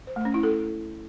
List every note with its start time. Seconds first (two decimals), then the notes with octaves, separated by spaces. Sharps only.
0.07 C5
0.16 A3
0.25 C#4
0.34 E4
0.43 A4